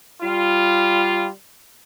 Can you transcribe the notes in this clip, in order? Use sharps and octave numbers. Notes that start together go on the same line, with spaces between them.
G3 F4